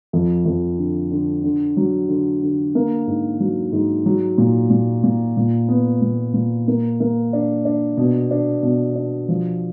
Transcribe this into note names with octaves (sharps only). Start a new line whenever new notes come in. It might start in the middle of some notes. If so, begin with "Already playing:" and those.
F2
F2
D3
D3
D3
F#3
D3
D3
A#3
G#2
F#3
G#2
F#3
A#2
A#2
A#2
A#2
B3
A#2
A#2
A#3
A#3
D4
D4
B2
D4
B2
D4
F3